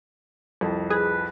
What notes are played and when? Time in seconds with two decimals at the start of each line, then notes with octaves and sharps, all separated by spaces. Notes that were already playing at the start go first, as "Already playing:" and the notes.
0.61 C2 F2
0.90 G#4 B4